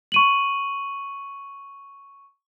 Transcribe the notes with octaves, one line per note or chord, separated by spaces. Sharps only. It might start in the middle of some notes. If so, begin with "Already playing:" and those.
C#6 D#7 F#7